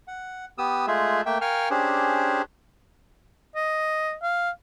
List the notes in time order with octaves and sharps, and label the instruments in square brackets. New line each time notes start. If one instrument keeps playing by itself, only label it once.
[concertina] F#5
B3 G4 D#6 E6
G#3 A3 F4 G#4 E5
A3 A#3 E5 G5
A#4 F5 G5 G#5 C#6 F6
C#4 D4 G4 G#4 C5
[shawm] D#5
F5